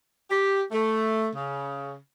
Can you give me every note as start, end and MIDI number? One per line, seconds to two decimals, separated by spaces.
0.29 0.62 67
0.71 1.27 57
1.34 1.95 49